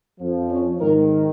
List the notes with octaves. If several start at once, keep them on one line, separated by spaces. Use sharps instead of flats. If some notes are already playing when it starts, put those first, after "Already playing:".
F2 F3
C#4
G#2 D#3 A#4